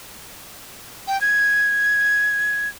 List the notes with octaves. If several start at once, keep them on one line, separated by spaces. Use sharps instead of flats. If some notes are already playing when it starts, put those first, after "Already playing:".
G5
G#6